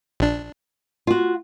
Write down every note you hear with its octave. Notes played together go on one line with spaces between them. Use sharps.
A#1 D4
F4 F#4